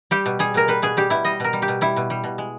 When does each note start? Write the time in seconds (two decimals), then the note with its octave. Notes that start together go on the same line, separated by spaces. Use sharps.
0.11 G3 G4
0.26 B2
0.39 G3 G#4
0.54 B2 A#4
0.68 G3 B4
0.82 B2 G#4
0.97 G3 G4
1.10 B2 E4
1.25 G3 D#5
1.40 B2 A#4
1.53 G3
1.62 G4
1.68 B2
1.81 G3 E4
1.97 B2
2.10 G3
2.24 B2
2.38 G#3